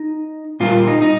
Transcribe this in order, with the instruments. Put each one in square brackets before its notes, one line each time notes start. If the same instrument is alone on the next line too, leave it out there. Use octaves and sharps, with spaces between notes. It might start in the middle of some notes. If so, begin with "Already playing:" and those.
Already playing: [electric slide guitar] D#4
A#2 G3 A#3 F4
D#4
D#4